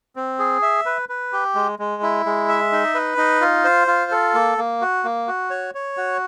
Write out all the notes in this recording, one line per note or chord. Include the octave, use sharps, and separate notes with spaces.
C4
G#4
E5
B4
B4
G4
G#3
G#3
E4
G#3
E5
D#4
B4
D#4
F4
C5
F4
A4
A#3
A#3
F#4
A#3
F#4
C#5
C#5
F#4